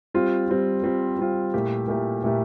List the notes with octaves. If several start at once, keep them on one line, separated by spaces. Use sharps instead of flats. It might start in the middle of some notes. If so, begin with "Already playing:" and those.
G3 C4 F4
G3 C4 F4
G3 C4 F4
G3 C4 F4
A#2 A3 E4 G4 A#4
A#2 A3 E4 G4 A#4
A#2 A3 E4 G4 A#4